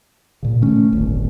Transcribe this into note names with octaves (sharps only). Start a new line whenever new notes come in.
A#2 C#3
D#3 A3 C#4
D1 G1